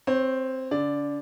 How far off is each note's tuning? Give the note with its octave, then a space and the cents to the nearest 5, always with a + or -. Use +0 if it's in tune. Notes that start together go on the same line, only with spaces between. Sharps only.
C4 +0 C#5 -25
D3 -40 D5 +0